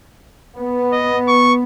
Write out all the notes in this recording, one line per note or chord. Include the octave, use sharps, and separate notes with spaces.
B3
D#5
C#6